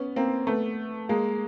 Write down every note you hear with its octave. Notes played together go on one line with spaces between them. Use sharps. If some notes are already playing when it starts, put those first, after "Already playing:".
Already playing: B3 C#4
A#3 C4
A3 B3
G#3 A#3